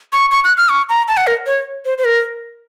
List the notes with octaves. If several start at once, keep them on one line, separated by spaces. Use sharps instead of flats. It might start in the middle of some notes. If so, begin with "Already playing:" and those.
C#6
C#6
F#6
F6
C#6
A#5
A5
F#5
A#4
C#5
C5
C5
A#4